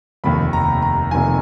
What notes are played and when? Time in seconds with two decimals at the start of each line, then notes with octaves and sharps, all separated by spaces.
0.24 F1 D#2 D#3 B5
0.53 A#5
0.82 A#5
1.11 F1 D#2 D#3 G#5